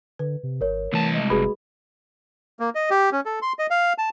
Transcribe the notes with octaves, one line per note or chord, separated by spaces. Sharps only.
D3 B4
C3
G#1 A#4 C#5
C2 E3 A3 A5
G#3 D#5
F#1 F#4 G#4 B4 B5
A#3
D#5
G4
C#4
A4
C6
D#5
F5
A5